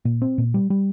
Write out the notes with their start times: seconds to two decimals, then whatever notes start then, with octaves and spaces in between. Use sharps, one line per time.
0.05 A#2
0.22 C4
0.38 A#2
0.54 G3
0.70 G3